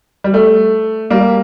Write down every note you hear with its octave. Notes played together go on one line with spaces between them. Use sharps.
G3
A3
G3 A#3